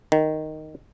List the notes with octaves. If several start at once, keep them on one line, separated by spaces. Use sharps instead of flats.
D#3